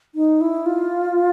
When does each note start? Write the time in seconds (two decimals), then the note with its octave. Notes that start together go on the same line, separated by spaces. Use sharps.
0.15 D#4
0.41 E4
0.66 F4